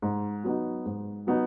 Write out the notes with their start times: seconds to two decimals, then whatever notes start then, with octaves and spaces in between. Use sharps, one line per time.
0.02 G#2
0.44 F#3 B3 D#4
0.86 G#2
1.27 F#3 B3 D#4